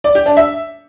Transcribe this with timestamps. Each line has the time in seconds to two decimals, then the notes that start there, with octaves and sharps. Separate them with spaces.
0.04 D5
0.15 G4
0.26 D4
0.37 E5